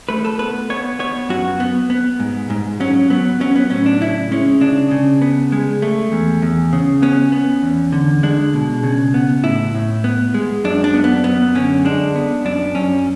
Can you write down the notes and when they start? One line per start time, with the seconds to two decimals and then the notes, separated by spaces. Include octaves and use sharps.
0.09 A3 B4
0.25 A4
0.39 B3 B4
0.70 B3 C#5
0.99 B3 C#5
1.29 F#2 F#4
1.60 B3
1.90 B3
2.20 G#2
2.50 G#2
2.80 F#3 C#4
3.10 F#3 B3
3.40 F#3 C#4
3.56 B3
3.70 A2 C#4
3.86 D4
4.01 C#3 E4
4.31 G#3 C#4
4.61 C#3 D4
4.91 C#3
5.22 B3
5.52 G#3
5.82 A3
6.12 E2
6.42 E2
6.73 C#3
7.02 B3 C#4
7.32 B3
7.62 E2
7.92 D3
8.23 G#3 D4
8.54 B2
8.83 C#3
9.14 B3
9.43 A2 E4
9.74 A2
10.04 B3
10.34 G#3
10.64 F#2 D4
10.84 D4
10.94 B3
11.04 B3
11.24 F#2 B3
11.55 D3 C#4
11.85 G#3 D4
12.15 B3
12.45 F#2 D4
12.75 F#2 C#4